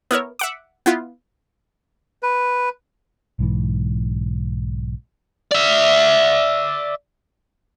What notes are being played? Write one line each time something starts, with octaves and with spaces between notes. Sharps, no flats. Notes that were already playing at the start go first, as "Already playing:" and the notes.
B3 E4 A#4 C#5
E5 F#5 D6
B3 E4 F4
B4
B1 G#2 E3
D5 E5